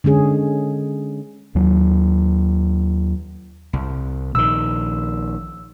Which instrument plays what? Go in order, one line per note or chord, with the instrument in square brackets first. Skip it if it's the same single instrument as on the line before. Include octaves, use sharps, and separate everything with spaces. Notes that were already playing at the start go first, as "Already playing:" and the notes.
[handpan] D3 G#3 C#4 G#4
[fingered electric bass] D#2 F#3
[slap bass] C2
[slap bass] A#1 D#3 [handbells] E6